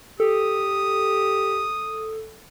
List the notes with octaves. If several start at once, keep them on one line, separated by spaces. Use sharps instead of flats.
G4 A4 D#6